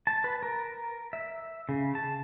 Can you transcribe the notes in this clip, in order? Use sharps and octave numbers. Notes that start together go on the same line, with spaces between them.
A5
B4
A#4
E5
C#3
A5